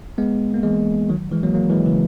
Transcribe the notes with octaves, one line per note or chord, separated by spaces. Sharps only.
G#3 B3
A#3
E3 G#3
D#3 F#3
E3 G#3
F#3 A#3
F#3 A#3
E3 G#3
C#3 E3